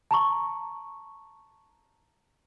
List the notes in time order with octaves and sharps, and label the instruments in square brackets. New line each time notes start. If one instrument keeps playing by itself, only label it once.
[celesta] A5 A#5 C#6